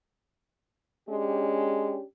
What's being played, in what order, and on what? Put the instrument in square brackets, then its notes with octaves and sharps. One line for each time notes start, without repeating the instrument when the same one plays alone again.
[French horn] G#3 [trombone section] C#4 D4 G4